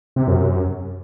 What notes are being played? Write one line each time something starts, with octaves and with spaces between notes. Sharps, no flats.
C3
F#2
F#2